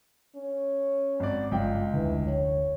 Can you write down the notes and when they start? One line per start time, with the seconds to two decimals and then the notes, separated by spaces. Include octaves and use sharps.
0.36 C#4
1.20 G#1 D5
1.51 G1 C#2 F4 G5
1.94 F1 D2 D3 E3
2.27 C#5